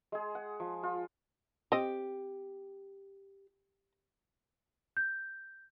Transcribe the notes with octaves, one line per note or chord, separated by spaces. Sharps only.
G#3 G#4
F#5
F3
F4
C4 G4 D#5
G6